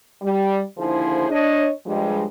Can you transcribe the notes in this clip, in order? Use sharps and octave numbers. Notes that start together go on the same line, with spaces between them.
G3
D#2 D3 F3 E4 G#4 C5
D4 C#5 D#5
G2 F3 G3 G#3